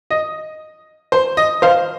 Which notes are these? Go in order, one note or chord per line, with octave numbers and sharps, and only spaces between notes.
D#5
C5
D#5
C5 F5